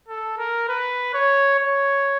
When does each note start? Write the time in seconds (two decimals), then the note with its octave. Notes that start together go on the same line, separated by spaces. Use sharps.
0.08 A4
0.38 A#4
0.69 B4
1.14 C#5
1.59 C#5